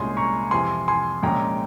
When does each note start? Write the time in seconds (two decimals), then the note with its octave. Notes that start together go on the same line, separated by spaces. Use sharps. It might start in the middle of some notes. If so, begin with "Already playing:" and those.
Already playing: C2 A#2 G#3 C#4 G#5 C6
0.17 A#5 C#6
0.51 F2 C3 E3 G#5 C6
0.88 G#5 C6
1.23 A#1 A#2 G#3 C#4 G5 A#5